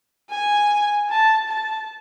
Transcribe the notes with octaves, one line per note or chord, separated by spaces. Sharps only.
G#5
A5
A5